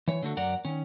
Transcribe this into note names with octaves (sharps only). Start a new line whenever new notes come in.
E3 C#5
D3 A3 F#4
F#2 A#4 D5 F#5 A#5
D#3 C#4